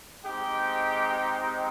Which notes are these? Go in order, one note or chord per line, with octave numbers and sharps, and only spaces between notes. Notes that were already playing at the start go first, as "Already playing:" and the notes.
G#3 C4 D#4 G4 G5